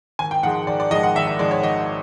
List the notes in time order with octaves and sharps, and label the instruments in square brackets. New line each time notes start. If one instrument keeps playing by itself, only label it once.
[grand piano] G#1 G#5
G5
G#2 F3 G#3 F#5
G#1 D5
D5
G#2 F3 G#3 D#5
F#5
G#1 E5
E5
G#2 F3 G#3 D5
C#5
G#1 D#5